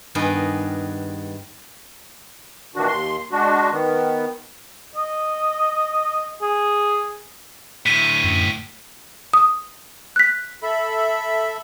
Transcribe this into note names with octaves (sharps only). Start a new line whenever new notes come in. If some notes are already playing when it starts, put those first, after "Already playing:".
G2 D#3 B3 G#4 A#4 D#5
A#2 D#3 E3 D4 F#4
D#2 C6
G#3 D4 F#4
D#3 B3
D#5
G#4
D2 A2 B6 D#7
F#2
D#6
F#6 B6
A4 E5 B5